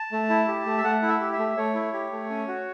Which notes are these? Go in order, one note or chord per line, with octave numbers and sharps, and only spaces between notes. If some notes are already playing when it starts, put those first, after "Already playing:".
Already playing: A5
A3
E4
G4
A3
E5
A3 F#5
E4
E5
G4
E5
A3
A3 C#5
E4
G4
A3
C#4
F#4